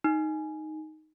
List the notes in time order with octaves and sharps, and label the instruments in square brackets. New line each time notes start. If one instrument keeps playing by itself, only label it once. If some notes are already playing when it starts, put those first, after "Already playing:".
[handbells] D#4